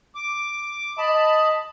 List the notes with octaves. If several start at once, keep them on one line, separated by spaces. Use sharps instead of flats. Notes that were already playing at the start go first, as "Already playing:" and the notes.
D6
D#5 A5 B5